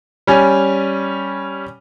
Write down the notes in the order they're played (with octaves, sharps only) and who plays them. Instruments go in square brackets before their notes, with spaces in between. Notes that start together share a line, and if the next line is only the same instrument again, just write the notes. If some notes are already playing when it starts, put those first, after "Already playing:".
[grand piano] G3 C#4 G#5